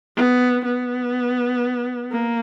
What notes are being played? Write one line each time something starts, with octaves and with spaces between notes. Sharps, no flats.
B3
B3
A#3